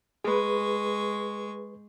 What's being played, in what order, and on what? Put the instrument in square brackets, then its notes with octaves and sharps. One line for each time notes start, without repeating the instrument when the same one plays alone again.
[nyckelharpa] G#3 C#6 [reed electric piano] G#4 B4